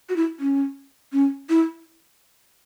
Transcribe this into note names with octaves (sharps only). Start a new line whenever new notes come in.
F#4
E4
C#4
C#4
E4